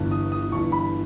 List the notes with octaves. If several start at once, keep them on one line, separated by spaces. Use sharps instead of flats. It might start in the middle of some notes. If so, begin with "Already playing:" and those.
Already playing: G1 G2 E3
D#6
D#6
G1 G2 E3 C#6
B5